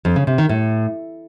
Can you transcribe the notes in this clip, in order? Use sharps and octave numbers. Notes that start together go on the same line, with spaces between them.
F2
C#3
C3
D#3
A2